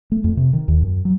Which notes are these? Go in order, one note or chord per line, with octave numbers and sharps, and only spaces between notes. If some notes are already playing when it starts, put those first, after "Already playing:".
A3
F2
C3
D#3
D#2
F#2
F#3